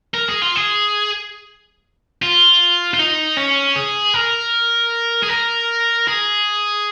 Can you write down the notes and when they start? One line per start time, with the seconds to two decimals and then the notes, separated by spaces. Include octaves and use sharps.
0.14 A#4
0.29 G#4
0.42 F4
0.56 G#4
2.22 F4
2.94 F4
2.99 D#4
3.37 C#4
3.76 G#4
4.14 A#4
5.23 G#4
5.29 A#4
6.07 G#4